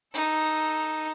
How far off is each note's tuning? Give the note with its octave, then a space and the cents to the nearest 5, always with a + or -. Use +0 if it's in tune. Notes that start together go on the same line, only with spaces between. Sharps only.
D#4 +0 A4 +0